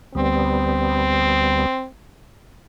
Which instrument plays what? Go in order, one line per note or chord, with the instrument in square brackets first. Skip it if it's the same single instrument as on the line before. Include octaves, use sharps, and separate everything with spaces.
[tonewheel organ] D2 G3 B3 [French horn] C4